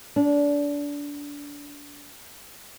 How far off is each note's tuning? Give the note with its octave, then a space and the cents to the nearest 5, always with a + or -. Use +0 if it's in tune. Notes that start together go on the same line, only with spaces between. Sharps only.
D4 -25